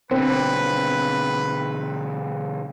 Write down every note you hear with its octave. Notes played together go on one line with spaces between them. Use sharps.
B2 D3 C4 B4